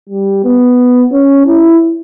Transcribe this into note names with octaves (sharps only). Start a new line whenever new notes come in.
G3
B3
C#4
E4